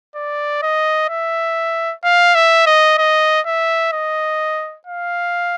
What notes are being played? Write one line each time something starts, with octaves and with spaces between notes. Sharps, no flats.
D5
D#5
E5
F5
E5
D#5
D#5
E5
D#5
F5